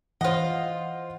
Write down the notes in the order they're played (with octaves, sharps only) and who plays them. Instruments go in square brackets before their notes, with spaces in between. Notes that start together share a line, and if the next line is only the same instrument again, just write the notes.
[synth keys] E3 [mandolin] F4 D#5 [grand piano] C5 F#5